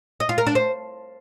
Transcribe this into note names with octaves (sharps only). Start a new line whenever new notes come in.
D#5
F4
A#4
D4
C5